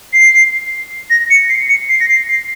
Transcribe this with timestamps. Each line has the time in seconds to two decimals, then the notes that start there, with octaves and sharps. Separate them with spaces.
0.13 C7
1.10 A#6
1.30 C#7
1.49 C7
1.69 C#7
1.89 C7
2.00 A#6
2.09 C7
2.28 C7